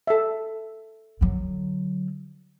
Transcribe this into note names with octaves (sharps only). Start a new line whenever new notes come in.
A4 E5
D3 F#3